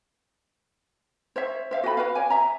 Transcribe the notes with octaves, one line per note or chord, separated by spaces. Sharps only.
C5 C#5 E5
C5 E5 F5
F#4 A4 G#5 B5
F#4 B4 F5
C#5 D5 G#5
E5 A#5